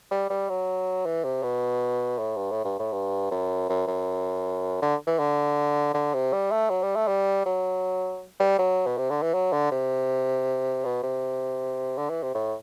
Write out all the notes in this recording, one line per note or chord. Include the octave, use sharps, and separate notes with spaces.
G3
G3
F#3
E3
C3
B2
A2
G2
A2
G2
A2
G2
F#2
F#2
F#2
D3
E3
D3
D3
C3
G3
A3
F#3
G3
A3
G3
F#3
G3
F#3
B2
C3
D3
E3
F#3
D3
C3
B2
C3
D3
E3
C3
A2